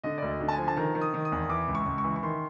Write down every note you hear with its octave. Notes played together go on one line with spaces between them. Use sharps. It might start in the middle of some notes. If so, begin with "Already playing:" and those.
D3 D#5
D2 D5
D#5
D3
A5
G#5
F3
A5
D#3 A#5
D#3
D#6
D#3
D#6
E2
E3 D6
C#2
C#6
C#2
C#6
E3
C#6
D#3 C6